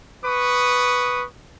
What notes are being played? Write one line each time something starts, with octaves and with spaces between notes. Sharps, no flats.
B4 C#6 D#6